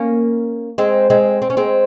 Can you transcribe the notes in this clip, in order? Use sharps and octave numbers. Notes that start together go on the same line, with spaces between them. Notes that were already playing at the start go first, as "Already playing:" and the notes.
Already playing: A#3 C#4
G#3 C4
G#3 C4
C4
C#4
G#3 C4